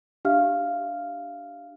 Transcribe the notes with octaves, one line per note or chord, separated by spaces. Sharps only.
D4 G4 E5 F5 F6